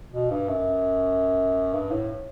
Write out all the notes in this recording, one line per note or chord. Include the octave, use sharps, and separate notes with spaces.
B2
G2
F#2
G2
A2